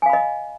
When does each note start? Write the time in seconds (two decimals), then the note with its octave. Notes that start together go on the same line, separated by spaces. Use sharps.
0.02 G#5
0.06 F5
0.10 B5
0.13 D#5